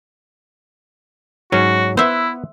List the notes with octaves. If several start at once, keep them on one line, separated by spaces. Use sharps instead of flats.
G#2 F#3 C#4 F#4
B3 E4 B4 C5 E5 F#5